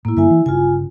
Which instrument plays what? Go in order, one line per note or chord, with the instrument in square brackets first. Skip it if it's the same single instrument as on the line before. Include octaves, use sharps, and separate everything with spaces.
[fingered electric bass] A2 [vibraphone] A#3 E4
[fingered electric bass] G2 D3 [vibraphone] E4 E5 G#5
[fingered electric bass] E3
[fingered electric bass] G1 C#3 [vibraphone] F4 G#5